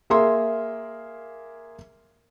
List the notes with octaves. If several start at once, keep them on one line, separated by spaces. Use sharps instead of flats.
A#3 G#4 A#4 E5 C6